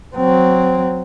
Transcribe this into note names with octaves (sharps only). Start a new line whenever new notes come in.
F#3 C4